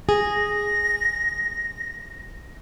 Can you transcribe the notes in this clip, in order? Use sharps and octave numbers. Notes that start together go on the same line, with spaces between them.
G#4 A#6